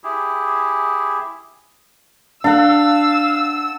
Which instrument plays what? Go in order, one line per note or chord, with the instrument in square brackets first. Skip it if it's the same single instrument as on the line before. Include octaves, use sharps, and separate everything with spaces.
[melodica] E4 G4 G#4
[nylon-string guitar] D4 [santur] A4 F#5 [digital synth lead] F5 [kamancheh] E6